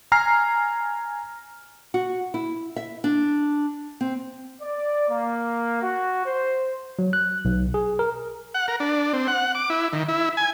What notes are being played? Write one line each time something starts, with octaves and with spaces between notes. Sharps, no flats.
G#5 A#5 F6 C7
F#4
E4
E5
D4
C4
D5
A#3
F#4
C5
F#3
F#6
B1
G#4
A#4
F#5
A#4
D4
C4
F#5
D6
E4
D#3
E4
G#5